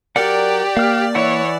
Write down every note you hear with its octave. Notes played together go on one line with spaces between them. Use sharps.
F#3 G4 A#4 D5 F#5
A#3 F5 F6
E3 E4 C#5 F#5